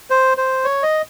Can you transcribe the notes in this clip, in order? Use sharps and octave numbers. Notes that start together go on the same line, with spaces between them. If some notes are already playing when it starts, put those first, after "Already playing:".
C5
C5
C#5
D#5